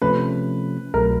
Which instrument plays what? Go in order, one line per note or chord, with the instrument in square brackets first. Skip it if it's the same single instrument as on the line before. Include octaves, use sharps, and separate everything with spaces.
[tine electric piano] C3 F3 A3 C#4 [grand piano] B4
[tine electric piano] C2 B2 F#3 A3 [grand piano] A#4